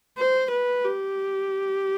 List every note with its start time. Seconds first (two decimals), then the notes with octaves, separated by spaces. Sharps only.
0.17 C5
0.51 B4
0.85 G4